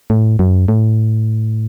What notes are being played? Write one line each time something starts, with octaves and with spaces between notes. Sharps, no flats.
A2
F#2
A2